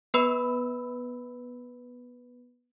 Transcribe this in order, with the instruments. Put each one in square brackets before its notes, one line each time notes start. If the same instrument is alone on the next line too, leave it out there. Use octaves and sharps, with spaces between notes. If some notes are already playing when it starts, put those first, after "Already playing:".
[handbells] B3 B4 B5 E6